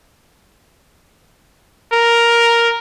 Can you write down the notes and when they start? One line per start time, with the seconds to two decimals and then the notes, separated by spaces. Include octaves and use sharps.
1.93 A#4